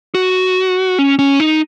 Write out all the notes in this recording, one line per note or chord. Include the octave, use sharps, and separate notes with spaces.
F#4
C#4
C#4
D#4